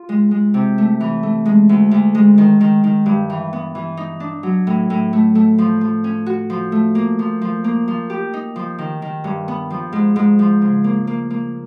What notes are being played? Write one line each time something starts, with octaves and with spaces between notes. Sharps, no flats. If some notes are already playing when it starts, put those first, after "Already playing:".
Already playing: F4
G#3
G#3
C3
A3
E3
A3
G#3
D2
D2
G#3
D#3
D#3
D#3
G2
E3
B3
E3
D#4
D4
F#3
A2
A2
A3
A3
F3
F3
C#4
F#4
F3
A3
A#3
F3
F3
A#3
F3
G4
D#4
F3
D#3
D#3
G2
B3
F3
G#2
G#2
F3
C#3
A#3
A#3
A#3